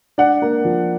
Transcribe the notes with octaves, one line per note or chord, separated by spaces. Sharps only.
D4 F#5
A#3
F3